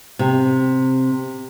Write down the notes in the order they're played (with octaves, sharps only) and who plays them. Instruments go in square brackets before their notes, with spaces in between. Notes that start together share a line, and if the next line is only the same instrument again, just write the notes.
[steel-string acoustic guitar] C3